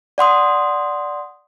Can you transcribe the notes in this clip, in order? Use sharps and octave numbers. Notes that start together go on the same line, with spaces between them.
D5 F#5 C6 D#6